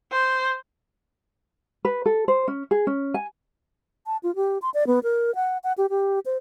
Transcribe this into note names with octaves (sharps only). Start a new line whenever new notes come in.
C5
B4
A4
C5
C#4
G#4
C#4
G#5
A5
F4
G4
C6
D5
B3
A#4
F#5
F#5
G4
G4
C5